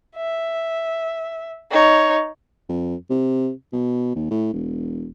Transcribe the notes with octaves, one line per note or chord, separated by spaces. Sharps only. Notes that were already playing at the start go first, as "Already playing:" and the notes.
E5
D#4 C#5
F2
C3
B2
D#2
A2
E1